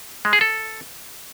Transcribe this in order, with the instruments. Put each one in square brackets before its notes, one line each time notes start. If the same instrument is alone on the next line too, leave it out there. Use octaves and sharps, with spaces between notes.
[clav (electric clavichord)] G#3
G#4
A4